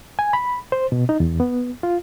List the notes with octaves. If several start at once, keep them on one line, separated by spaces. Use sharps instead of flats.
G#5
B5
C5
B2
D#4
E2
B3
F4